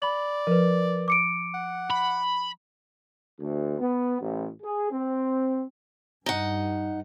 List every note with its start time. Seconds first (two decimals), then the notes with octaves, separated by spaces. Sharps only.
0.02 D5 B5 F#7
0.47 F3 A#4 B4
1.08 D6 C#7 D7
1.54 F#5
1.90 B5
3.40 D2
3.80 B3
4.20 A1
4.62 G#4
4.90 C4
6.26 G2 D#4 F#5